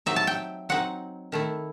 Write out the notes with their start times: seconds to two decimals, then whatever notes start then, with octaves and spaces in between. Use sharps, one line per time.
0.06 F#3 C4 D#4 E5
0.16 A5
0.27 G5
0.69 F#3 C4 D#4 F#5
1.32 D#3 A3 E4